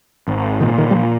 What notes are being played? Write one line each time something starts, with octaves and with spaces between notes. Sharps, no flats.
G#1
A#2 D#3
D#3
G3
A#2 F3